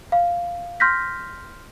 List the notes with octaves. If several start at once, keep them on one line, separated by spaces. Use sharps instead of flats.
F5
C6 F6 G6 A#6 B6